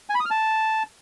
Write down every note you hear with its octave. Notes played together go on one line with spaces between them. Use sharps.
G#5
B5
D#6
F6
A5